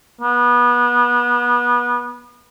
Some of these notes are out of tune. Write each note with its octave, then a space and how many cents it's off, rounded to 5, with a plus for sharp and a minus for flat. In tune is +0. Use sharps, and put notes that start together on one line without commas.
B3 -25